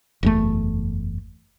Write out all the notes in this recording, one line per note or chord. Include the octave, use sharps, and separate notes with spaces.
F#1 E2 A3